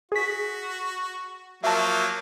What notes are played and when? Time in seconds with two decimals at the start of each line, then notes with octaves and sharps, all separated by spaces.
0.12 F#4 G#4 B6
1.64 F3 F#3 A#3 E5 A5